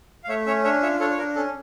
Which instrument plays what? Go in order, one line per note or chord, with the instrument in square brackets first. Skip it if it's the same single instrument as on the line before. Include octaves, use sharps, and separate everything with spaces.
[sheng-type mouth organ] F5
A3 C#5 E5
C#4 C#5 E5
D4 C#5 E5
F4 C#5 E5
D4 A4 C#5
C#5
D4 A#4
C#4 A4